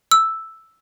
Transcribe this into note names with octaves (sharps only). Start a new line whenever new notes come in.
E6